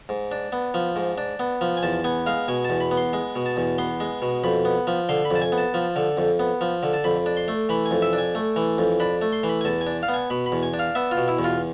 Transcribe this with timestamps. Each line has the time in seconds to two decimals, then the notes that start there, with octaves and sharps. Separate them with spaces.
0.09 G#2
0.32 D4
0.52 B3
0.74 F3
0.96 G#2
1.18 D4
1.39 B3
1.61 F3
1.77 G#5
1.83 E2 A5
2.04 B3 G#5
2.26 G#3 F5
2.48 B2 G#5
2.65 A5
2.70 E2
2.80 B5
2.91 B3
2.97 C6
3.13 G#3
3.36 B2
3.46 A5
3.57 E2
3.78 B3 C6
4.00 G#3
4.22 B2
4.44 F2 B5
4.65 B3
4.87 F3
5.09 D3 C6
5.25 B5
5.31 F2 A5
5.42 G#5
5.52 B3
5.58 A5
5.74 F3
5.96 D3
6.17 F2
6.39 B3
6.61 F3
6.83 D3
6.93 A5
7.04 F2 B5
7.26 D4
7.37 C6
7.48 A3
7.69 E3 B5
7.86 G#5
7.91 F2
8.02 E5
8.13 D4
8.18 G#5
8.35 A3
8.56 E3
8.78 F2
9.00 D4 B5
9.22 A3
9.33 C6
9.43 E3
9.49 B5
9.61 G#5
9.65 E2 A5
9.81 G#5
9.87 D4
10.03 F5
10.08 B3
10.14 G#5
10.30 B2 B5
10.46 B5
10.52 E2
10.63 G#5
10.74 D4
10.79 F5
10.95 B3 E5
11.11 F4
11.17 B2
11.28 E4
11.39 E2
11.44 F4